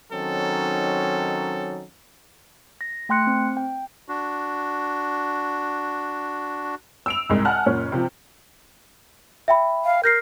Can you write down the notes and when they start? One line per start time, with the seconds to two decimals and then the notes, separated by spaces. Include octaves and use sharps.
0.12 D#3 F#3 C4 C#4 D#4 A4
2.81 A#6
3.09 A3 G5 C6 F#6 C#7
3.27 C4
3.57 G5
4.09 D4 F#4
7.06 E6 D7 F7
7.30 C2 G#2 G#3
7.45 F#5 G#5 A5 F6 F#6
7.66 F#1 A#2 C#4
7.92 C3 F3
9.48 E5 G5 B5
9.85 F5
10.04 A#4 G6 A#6 C7